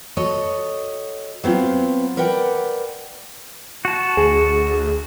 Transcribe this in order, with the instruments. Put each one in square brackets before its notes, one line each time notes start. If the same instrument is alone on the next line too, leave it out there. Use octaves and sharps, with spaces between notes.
[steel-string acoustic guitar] F#4 A4 C#5 D#5
F#3 B3 C4 F4
A#4 B4 D5 F#5 G5
[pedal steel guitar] F#4 A5
[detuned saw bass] D2 [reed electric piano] G#4